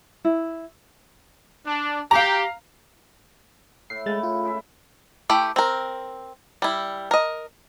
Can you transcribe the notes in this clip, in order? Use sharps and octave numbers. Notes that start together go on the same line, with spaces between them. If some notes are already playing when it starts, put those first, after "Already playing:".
E4
D4
G4 F5 A#5
A2 C7
A2 C#3 G#3 B5 A6
F4
G#3 E5
A3 E4 G4 G5
C4 A#4
G3 E4
A#4 D#5